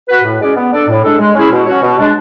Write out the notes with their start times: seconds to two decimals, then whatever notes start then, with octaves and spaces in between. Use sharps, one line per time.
0.08 F#4 B4
0.24 A2
0.40 G#3 C#4 G#4 D5
0.56 B3
0.72 D4 A4 D5
0.88 A2
1.03 G#3 D4 A4
1.19 G#3
1.35 C#4 E4 G#4
1.50 B2
1.66 F#3 C#4 F#4 C#5
1.82 B2
1.99 G#3 D4